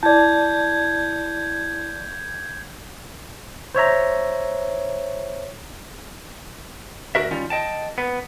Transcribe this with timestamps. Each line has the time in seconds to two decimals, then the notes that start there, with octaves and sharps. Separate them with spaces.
0.03 E4 D5 A5 G6 G#6
3.75 C5 C#5 E5 A#5
7.15 D2 F#4 A#4 E5
7.31 D#3 G3 C#4 F4
7.50 D#5 G5 A5
7.98 B3